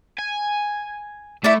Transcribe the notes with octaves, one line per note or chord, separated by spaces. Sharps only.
G#5
A3 E4 D5